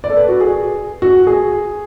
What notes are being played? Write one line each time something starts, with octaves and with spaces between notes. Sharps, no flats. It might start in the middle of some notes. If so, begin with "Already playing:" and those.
D5
A4
B4
F#4
G#4
F#4
G#4